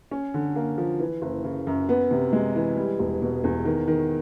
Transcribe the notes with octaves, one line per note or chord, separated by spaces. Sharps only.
C#4
D3
A#3
F3
E3
F#1
C#3
F#2
B3
C3
G#3
E3
G3
E1
B2
E2
D#3
D#3